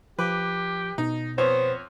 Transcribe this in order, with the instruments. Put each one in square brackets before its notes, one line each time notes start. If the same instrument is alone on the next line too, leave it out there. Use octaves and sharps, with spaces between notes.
[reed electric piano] F3 D6 [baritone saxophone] G4 [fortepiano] B4
[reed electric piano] B2 [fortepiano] D#4
[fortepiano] F2 C#5 [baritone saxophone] B3 [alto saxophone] C5